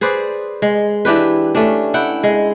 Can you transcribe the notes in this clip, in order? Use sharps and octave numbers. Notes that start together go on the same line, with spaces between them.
G#4 B4 C5 D5
G#3
E3 D4 G4 B4
A3 C#4 D4
E4 F#5 G5
G#3